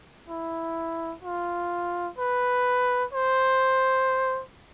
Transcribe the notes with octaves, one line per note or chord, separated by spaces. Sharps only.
E4
F4
B4
C5